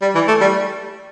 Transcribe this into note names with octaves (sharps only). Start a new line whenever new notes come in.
G3
E3
A3
G3